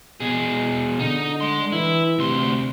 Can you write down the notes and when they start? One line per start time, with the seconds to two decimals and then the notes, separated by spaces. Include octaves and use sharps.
0.20 B2 G#4
0.99 D3 D#4
1.41 G#3 C6
1.72 E3 E4
2.19 D2 C3 C6